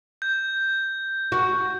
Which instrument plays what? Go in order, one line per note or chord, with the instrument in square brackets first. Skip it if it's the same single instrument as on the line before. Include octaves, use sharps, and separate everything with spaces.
[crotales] G6
[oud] F#4